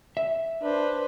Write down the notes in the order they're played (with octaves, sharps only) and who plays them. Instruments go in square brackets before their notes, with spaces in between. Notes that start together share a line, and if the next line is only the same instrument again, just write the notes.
[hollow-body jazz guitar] E5
[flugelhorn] D4 [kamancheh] B4 C5